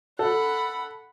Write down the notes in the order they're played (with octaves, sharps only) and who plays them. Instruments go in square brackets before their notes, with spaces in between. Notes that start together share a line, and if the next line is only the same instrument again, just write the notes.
[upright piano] A4 [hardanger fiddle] F#5 B5